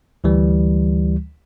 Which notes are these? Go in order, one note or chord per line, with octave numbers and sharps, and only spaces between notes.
D2 E3 G3